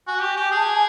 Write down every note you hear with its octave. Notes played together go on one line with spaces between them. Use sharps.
F#4 G#5
G4
G4
G#4 A5
G#5